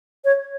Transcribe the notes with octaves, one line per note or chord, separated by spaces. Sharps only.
C#5